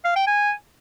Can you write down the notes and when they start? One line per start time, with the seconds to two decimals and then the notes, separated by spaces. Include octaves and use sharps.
0.05 F5
0.16 G5
0.27 G#5